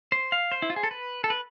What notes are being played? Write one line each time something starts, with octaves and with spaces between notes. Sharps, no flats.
C5
F5
C5
E4
F4
G#4
A4
B4
A4
B4